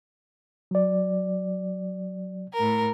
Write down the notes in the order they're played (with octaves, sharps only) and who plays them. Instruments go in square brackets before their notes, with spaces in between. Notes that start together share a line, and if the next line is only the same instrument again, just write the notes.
[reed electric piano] F#3 D5
[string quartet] A2 A#4